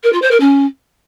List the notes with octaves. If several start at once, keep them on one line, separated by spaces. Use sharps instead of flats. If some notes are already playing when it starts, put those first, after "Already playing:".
A#4
F4
C5
A#4
C#4